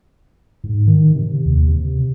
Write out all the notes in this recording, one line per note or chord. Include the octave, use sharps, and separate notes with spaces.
G#2
D#3
C3
D#2
C3